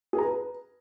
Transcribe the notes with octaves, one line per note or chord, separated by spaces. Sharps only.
G#4
A#5
B4